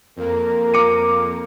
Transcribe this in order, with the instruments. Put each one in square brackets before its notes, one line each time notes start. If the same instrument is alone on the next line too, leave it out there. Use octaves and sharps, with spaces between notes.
[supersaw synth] F2 A#3 [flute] A#4
[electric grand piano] D6 C#7 D#7